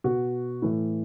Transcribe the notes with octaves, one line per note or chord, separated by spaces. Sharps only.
B2 F#4
A2 E3